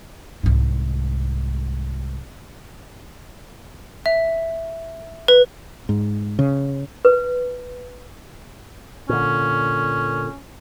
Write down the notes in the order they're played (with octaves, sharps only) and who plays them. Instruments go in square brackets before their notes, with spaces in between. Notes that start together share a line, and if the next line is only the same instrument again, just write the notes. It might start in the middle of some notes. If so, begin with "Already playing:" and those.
[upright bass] C2 G#2
[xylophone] E5
B4
[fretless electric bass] G#2
C#3
[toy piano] B4
[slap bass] A#2 D3 [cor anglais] C#4